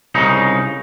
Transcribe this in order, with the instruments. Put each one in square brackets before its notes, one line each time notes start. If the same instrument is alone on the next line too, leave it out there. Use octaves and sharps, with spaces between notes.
[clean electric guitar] C2 C#3 D#4